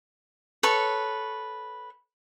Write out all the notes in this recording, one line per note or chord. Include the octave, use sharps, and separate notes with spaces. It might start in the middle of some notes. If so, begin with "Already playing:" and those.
A4 B4 C#5 C#6